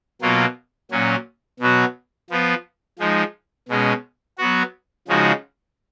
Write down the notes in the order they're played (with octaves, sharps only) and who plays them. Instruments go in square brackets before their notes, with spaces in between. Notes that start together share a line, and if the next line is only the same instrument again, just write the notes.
[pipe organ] B2 F#3 A#3 F4
A#2 F#3 C#4
B2 F#3 B3 F#4
F3 B3 F4
F3 G#3 D#4
B2 G#3 C#4
F#3 B3 F#4
C#3 F3 G#3 D#4 F#4